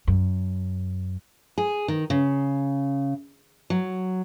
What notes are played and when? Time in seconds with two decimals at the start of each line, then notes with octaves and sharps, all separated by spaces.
0.07 F#2
1.58 G#4
1.88 D#3
2.10 C#3
3.70 F#3